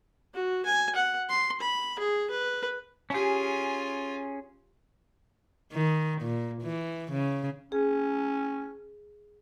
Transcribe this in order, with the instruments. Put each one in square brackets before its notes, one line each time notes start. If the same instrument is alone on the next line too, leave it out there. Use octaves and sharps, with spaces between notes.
[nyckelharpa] F#4
G#5
F#5
C6
B5
G#4
B4
[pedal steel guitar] C#4 G#4 [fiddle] F4 G#5 [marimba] G4 A5
[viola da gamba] D#3
A#2
E3
C#3
[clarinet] C#4 [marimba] G#4